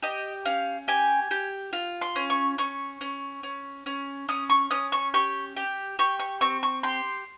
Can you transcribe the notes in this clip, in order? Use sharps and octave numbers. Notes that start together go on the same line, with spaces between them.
G4 D#5
C#4 F5
G4 G#5
G4
F4
C6
C#4
C#6
C#4 C#6
C#4
C#4
C#4
C#4 D#6
C#6
C#4 D#6
C#6
G4 C#6
G4
G4 C#6
C#6
C4 C#6
C#6
G4 C6